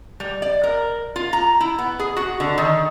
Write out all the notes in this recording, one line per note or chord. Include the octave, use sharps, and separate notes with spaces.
G3
D5
A#4
F4
A#5
E4
B3
G#4
F#4
D3
D#3